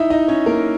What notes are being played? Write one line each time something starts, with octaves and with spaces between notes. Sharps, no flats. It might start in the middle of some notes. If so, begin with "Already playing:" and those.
Already playing: D#4 E4 D#5 E5
D#4 D#5
C#4 C#5
A#3 A#4